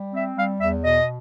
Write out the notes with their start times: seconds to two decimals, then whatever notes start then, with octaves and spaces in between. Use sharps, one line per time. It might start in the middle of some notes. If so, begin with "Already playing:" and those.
Already playing: G3
0.13 C4 E5
0.36 G3 F5
0.60 E2 E5
0.83 B2 D#5